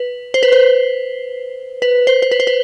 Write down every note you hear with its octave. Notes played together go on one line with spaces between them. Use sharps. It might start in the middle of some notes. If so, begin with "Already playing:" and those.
Already playing: B4
C5
B4
C5
B4
C5
C5
B4
C5
B4